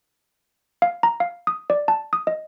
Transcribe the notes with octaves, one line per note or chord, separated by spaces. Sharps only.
F5
A#5
F5
D#6
D5
A5
D#6
D#5